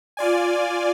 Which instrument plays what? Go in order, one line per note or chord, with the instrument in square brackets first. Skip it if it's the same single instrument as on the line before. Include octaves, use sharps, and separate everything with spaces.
[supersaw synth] F4 D5 G#5